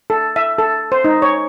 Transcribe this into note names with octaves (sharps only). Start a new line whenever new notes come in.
A4
E5
A4
C5
D#4
C#5